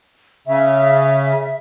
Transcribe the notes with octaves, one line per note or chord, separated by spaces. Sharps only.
C#3 E5